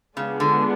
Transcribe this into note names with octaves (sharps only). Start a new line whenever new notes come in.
C#3 G#3 B3 D4 F4 G#4
D3